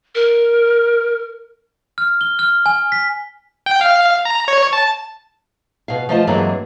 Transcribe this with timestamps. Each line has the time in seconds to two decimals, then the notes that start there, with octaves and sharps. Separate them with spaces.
0.15 A#4
1.98 F6
2.21 G7
2.39 F6
2.66 G#5
2.92 B6
3.66 G5
3.81 F5
4.25 A#5
4.48 C#5
4.73 A5
5.88 B2 F5
6.09 F3 A3 F4 D#5 A5
6.27 G2 E3 F#3 G#3 A#3 C4